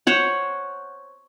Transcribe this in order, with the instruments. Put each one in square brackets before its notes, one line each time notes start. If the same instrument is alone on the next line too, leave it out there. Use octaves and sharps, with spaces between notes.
[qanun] C5 C#5 F#5